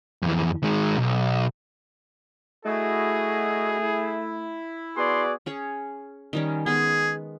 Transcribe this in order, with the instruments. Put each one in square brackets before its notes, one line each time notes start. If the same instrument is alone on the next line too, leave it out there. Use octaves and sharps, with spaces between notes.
[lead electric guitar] F2 E3
D#3 G#3
B1
[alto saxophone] A3 [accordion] E4 F#4 D#5 [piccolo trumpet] G#4
[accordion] E4
[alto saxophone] B3 [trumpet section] F#4 G#4 D5 [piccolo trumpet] C6
[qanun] C#4 G#4 C#5
D#3 G3 C#4
[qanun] G#3 B3 [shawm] G#4